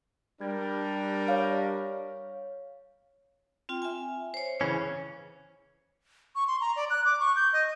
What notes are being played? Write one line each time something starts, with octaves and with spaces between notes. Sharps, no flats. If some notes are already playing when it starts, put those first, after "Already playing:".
G3 D4 A#4 G#6
C#5 F5
C4 F4 G5
E5 G#5
C5 C#5
C#3 E3 C#4
C#6
C6
A#5
D5
F#6
D6
C#6
G6
D#5